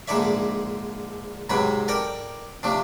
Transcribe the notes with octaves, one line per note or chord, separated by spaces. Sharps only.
A#1 G#2 D3 A4 D5 E5
G#2 C3 F#3 B4 G5
A4 A#4 D5 G5
C3 F3 A3 D4